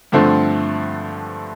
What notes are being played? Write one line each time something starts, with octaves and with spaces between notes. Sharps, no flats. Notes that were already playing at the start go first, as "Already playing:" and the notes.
G2 D3 F3 A3 C4